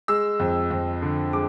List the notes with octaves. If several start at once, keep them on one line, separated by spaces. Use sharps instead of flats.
G#3 E6
F2
F2
D3
G#3 D6